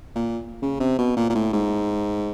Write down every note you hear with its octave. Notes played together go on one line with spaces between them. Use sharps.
A#2
C#3
C3
B2
A#2
A#2
A2
G#2